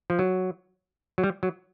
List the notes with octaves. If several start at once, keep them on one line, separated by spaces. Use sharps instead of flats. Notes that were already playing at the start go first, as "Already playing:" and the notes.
F3
F#3
F#3
G3
F#3